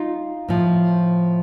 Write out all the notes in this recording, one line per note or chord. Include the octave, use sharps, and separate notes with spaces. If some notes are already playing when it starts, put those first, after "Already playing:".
Already playing: D#4 F4
A2 F3